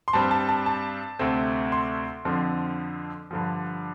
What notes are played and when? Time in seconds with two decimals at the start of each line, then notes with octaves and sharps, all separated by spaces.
0.08 C6
0.13 G2 G3 C4 A5
0.31 A5
0.49 A5
0.66 A5
1.19 D2 C3 A3 C4
1.72 C6
2.25 F2 D3 F3 C4
3.31 G2 D3 F3